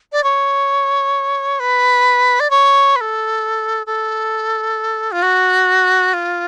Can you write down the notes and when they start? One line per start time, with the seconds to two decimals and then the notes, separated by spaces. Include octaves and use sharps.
0.12 D5
0.24 C#5
1.60 B4
2.40 D5
2.50 C#5
2.96 B4
3.01 A4
3.86 A4
5.12 F4
5.22 F#4
6.13 F4